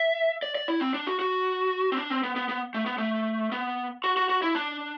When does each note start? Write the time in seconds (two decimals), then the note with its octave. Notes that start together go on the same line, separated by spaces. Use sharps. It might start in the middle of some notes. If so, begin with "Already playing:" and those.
Already playing: E5
0.42 D5
0.55 D5
0.68 E4
0.81 C4
0.94 D4
1.07 F#4
1.19 F#4
1.92 C4
1.97 D4
2.10 C4
2.23 B3
2.36 B3
2.49 B3
2.74 A3
2.86 B3
2.98 A3
3.52 B3
4.04 F#4
4.17 F#4
4.29 F#4
4.42 E4
4.55 D4